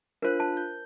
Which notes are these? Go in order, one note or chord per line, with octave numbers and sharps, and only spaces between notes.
D4 F4 A#4 C5 F#6
A5
G6